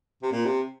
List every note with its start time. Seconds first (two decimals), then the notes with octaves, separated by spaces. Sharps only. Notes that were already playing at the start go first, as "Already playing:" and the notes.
0.23 C3
0.31 A#2
0.45 C3